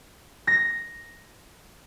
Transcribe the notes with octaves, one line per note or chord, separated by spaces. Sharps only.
A#6